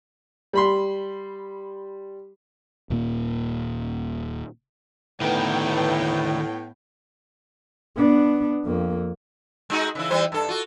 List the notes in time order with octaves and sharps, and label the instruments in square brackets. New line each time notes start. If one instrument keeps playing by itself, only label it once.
[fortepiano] G3 B5 C6
[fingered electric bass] D#1 A#2 A#3
[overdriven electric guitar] D2 D#3 [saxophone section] A2 [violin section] B3 G5
[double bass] B3 D4
F2 A#3
[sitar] G#3 D#4 F#4
C#3 E3 E4
E3 G3 C5
G2 A4
F4 F#4